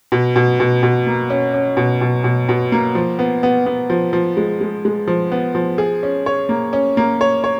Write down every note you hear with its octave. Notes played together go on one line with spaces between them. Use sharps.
B2
B2
B2
B2
A#3
C#4
C#4
B2
B2
B2
B2
A#3
F3
B3
B3
B3
F3
F3
G#3
G#3
G#3
F3
B3
F3
G#4
C#4
C#5
A#3
C#4
A#3
C#5
C#5